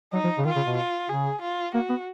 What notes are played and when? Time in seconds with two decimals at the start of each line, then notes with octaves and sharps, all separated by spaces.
0.13 F#3 D#4
0.24 F3
0.38 C#3
0.45 D#3 F4
0.56 C#3
0.67 B2
0.77 F4
1.09 C#3 G#4
1.42 F4
1.74 A#3 F#4
1.90 B3